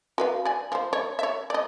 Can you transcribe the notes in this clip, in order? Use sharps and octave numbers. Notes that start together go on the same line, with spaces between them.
F#4 B4 F5
D5 G#5
F3 C5
C#5
C#5 E5
D5 D#5